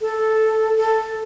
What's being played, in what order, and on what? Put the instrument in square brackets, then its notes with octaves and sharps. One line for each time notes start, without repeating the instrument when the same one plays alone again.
[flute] A4
A4